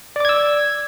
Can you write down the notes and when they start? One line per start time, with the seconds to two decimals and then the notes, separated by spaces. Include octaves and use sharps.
0.16 D5
0.20 D6
0.25 G#6
0.29 E6